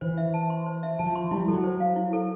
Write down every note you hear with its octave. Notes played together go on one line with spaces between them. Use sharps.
E3 C5
E5
A5
C6
C5
E5
F3 A5
C6
G3 E4
F#3 A4
C5
F5
E4
A4